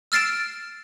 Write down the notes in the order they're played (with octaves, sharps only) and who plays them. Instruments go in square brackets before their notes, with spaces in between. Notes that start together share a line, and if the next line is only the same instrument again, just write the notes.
[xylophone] E6 F6 A6 C7 D7 E7